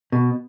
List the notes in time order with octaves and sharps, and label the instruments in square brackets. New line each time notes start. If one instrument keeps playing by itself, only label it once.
[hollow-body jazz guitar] B2